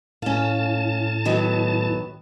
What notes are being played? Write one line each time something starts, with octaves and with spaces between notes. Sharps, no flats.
A2 C#4 F5 A5
D#3 F#3 B3